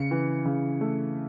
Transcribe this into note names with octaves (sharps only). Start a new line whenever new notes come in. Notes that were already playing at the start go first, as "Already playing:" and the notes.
Already playing: C#3 C#7
E3
C#3
A3